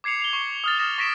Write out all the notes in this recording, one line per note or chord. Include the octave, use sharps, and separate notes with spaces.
D6 G#6 C7 C#7 F7
C7 F7 G7
C#6
D#6 F6 A6
F6 A#6 E7 F7 G7
C#6 A#6 B6 D7 E7